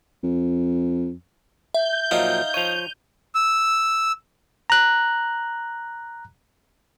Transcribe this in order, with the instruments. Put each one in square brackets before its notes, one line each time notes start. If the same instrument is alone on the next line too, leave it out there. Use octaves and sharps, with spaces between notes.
[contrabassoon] F2
[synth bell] E5 [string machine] G6
[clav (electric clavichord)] A#2 F3 F#3 [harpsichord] D#4 F5
[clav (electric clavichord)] F3 C#5 [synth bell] D#7 F7
[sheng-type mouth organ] E6
[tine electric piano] A#5 F#6